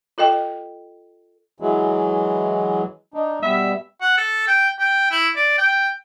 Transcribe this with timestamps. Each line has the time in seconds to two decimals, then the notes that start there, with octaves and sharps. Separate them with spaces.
0.18 F4 A4 D#5 G5
1.60 E3 F#3 G#3
3.14 D4 D#4
3.43 B2 G3 B3 E5
4.01 F#5
4.18 A4
4.48 G5
4.79 G5
5.11 E4
5.36 D5
5.58 G5